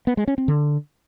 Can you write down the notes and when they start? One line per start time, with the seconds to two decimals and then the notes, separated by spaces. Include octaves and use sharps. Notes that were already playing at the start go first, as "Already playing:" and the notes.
0.07 B3
0.17 G#3
0.28 C#4
0.38 C4
0.48 D3